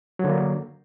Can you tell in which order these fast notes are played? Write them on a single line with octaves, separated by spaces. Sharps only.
F#3 D3 A#3